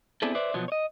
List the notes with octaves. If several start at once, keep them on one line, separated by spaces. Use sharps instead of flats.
B3 C4 D4 E4 G#4 A4
B4 C5 D5 E5
B2 F3 F#3 B3
C#5 D#5